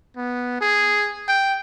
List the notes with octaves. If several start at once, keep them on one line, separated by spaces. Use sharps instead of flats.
B3
G#4
G5